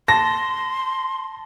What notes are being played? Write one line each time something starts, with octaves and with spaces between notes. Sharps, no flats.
A5 C6 A#6